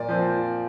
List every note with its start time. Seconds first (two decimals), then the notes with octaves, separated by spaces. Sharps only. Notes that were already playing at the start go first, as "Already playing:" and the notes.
Already playing: A#2 D5
0.08 F3 C4